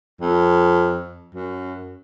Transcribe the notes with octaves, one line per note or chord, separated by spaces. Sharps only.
F2
F#2